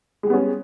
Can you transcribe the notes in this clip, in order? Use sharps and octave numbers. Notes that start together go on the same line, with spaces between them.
G3 G#3 B3 C#4